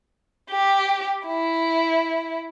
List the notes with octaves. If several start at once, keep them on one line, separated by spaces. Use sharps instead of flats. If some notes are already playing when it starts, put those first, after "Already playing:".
G4
E4